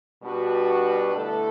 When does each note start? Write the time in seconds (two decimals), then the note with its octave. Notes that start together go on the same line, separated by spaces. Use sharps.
0.23 B2 G3 D4 F#4 B4
1.16 D3 A3 E4 A4